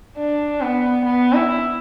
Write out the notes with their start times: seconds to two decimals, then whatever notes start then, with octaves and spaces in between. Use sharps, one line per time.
0.17 D4
0.62 B3
1.05 B3
1.34 E4